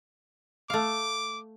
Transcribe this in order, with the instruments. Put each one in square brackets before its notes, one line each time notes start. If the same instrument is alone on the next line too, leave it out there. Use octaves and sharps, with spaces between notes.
[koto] A3 F5 [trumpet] D6